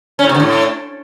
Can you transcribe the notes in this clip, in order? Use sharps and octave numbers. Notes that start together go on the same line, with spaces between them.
C#4
A2
C3
D3
A2